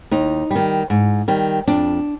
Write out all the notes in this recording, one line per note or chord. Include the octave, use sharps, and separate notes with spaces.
D#2 D#4
G3
D#3
G#2
D#3 G3
F2 D4